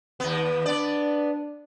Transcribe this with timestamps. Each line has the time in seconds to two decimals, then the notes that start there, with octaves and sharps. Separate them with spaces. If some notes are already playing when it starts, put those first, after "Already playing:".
0.20 D#2 B3
0.66 B3 D4 D5